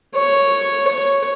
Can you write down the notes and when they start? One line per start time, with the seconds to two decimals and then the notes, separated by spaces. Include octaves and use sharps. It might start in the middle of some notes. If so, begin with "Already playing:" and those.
0.16 C#5
0.88 C#5